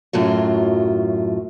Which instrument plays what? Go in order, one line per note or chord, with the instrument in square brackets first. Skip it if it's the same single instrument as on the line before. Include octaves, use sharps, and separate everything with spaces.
[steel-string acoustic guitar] F#2 A2 F#3 F4